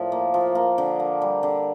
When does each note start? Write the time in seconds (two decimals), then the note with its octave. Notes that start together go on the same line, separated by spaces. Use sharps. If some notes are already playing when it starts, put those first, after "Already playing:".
Already playing: A2 F3 A#4 D5
0.12 A#3
0.34 F3
0.55 A#3
0.78 D3
1.00 A#3
1.22 G3
1.43 D3